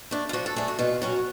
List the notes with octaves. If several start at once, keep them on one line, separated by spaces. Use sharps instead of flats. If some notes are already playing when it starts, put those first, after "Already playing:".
A3 D4
F4
F3 F#4
A4
A3 D4 G#4
F#4
B2 F4
F#3 C#4 F#4